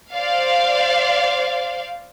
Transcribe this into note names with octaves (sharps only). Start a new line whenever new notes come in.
C5 D5 F5